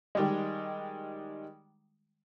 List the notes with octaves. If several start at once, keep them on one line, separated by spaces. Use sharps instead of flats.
D#3 G3 G#3